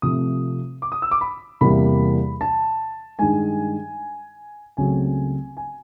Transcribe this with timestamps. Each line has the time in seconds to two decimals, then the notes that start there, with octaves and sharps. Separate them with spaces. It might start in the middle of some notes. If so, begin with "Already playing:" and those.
0.02 C3 F3 A3 C4 D#6
0.82 D6
0.92 D#6
1.02 E6
1.11 D6
1.21 B5
1.61 E2 C3 E3 G3 A#3 B5
2.41 A5
3.19 G2 D#3 G#3 G#5
4.77 C#2 C#3 F#3 A3 C4 G#5
5.57 G#5